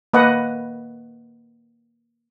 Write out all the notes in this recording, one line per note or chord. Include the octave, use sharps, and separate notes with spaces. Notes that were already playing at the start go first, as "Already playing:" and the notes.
A#3 B4 D#5 F#5